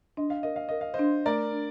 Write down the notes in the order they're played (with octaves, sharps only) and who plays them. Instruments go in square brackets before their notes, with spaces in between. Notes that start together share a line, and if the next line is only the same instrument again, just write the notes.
[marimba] D4 [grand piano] D#5
[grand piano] F5
[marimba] A#4 [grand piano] D#5
[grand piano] F5
[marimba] A#4 [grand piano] D#5
[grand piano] F5
C5 D#5
[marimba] D4
[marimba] A3 [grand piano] A#4 D5
[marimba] D4